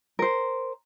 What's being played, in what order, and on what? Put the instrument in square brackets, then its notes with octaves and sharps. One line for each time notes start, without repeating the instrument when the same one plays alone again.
[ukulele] A#4 C5